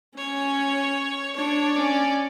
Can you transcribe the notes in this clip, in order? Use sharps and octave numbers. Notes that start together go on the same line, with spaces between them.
C#4 C#5
D4 C#5
C#4 D5